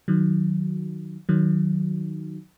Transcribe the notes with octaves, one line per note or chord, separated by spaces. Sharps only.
D#3 F#3
D#3 F#3